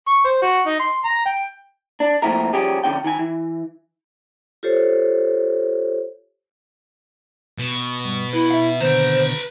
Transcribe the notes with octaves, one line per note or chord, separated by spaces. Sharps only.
C#6
C5
F#4
D#4
C6
A#5
G5
D4
A#2 F3 A3 C4 E4 A#4
F3 G3 C#4 G4 G#4
F2 D3 G#3 C#4 G5
D#3 G#5
E3
F4 G4 A4 C5 C#5
B2
G2
E4 B4
E5 F5
D#2 B2 D3 B4 C5 A#5